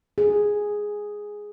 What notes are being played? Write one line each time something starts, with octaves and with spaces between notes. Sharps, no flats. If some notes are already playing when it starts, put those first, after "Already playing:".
G#4